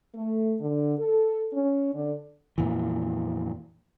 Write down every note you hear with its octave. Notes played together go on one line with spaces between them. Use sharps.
A3
D3
A4
C#4
D3
F2 A#2 E3